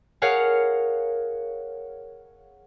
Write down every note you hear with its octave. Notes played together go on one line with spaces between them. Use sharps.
G#4 A#4 C#5 F5 F#5